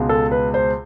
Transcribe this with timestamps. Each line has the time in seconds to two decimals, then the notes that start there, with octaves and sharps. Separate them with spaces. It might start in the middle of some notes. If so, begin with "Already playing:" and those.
Already playing: C#2 B2 G#3
0.09 A4
0.32 B4
0.54 C5